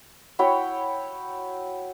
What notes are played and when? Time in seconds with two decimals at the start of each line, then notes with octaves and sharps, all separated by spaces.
0.39 E4 F#4 C#5 G5